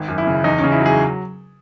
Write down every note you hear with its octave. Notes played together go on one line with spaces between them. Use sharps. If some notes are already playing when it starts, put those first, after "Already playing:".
Already playing: G#1
F#2
E4
C#3
E2 D#4
C#4
C#3
E4
F#3
G#4